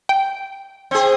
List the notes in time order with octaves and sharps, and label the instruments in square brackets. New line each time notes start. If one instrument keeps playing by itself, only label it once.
[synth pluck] G5
[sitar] C4 G#4